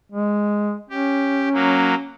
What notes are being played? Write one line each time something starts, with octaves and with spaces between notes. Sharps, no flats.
G#3
C#4 G4
F#3 A#3